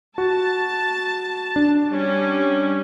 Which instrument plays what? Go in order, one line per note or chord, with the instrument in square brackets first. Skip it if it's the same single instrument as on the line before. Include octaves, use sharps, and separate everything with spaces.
[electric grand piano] F#4 [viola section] A5
[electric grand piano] D4
[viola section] G3 C#4